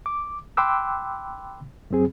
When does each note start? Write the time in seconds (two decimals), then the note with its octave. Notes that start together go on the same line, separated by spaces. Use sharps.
0.06 D6
0.57 G5 B5 C6 D6 E6 F#6
1.90 F#2 F#3 C4 G#4